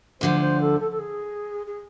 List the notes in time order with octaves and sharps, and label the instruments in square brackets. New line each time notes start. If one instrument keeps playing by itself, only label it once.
[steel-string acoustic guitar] D2 D3 F3 [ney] C5
[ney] C5
A4
A4
A4
G#4
G#4